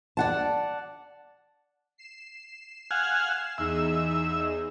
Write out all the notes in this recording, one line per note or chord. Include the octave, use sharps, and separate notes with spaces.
D5 F#5 A5
C7 E7
F5 F#5 G#5
E2 D#4 G#4 E5